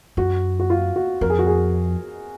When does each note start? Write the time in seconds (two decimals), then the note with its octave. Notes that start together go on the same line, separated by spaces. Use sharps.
0.17 F#2 F#4
0.60 F#4
0.70 F4
0.96 F#4
1.21 F2 A#4
1.30 G#4
1.39 F#4
1.47 G#4